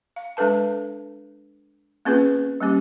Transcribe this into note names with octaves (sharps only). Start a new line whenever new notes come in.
F5
G#3 D4 A4 B4 A5
A#3 C4 C#4 F4 G#4 B4
G3 A#3 C#4 G4